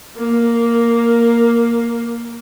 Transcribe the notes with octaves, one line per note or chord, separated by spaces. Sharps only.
A#3